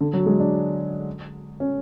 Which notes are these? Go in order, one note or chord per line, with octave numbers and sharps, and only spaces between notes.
D3
F#3
G#3
D4
C#4